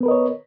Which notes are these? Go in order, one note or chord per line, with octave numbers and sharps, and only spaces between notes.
B3 A#4 B4 C#5 D#5